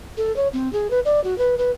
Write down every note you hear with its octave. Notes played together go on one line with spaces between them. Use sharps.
A4
C#5
C4
G#4
B4
D5
F#4
B4
B4